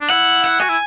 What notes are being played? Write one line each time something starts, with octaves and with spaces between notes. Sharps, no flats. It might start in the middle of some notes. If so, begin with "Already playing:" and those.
D4
E4 F#5
F#5
F#4 G#5
E4